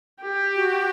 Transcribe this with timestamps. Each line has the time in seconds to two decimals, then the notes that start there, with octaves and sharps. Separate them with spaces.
0.22 G4
0.56 F#4